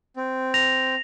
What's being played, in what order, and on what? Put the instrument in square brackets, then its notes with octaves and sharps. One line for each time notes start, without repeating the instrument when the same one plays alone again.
[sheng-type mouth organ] C4
[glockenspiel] A#6 F7